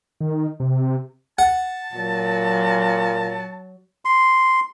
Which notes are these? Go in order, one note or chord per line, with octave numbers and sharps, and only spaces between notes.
D#3
C3
F#5 A5
A#2 F#3
C6